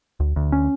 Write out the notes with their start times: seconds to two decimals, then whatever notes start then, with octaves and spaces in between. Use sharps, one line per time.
0.20 D2
0.36 D2
0.52 C#4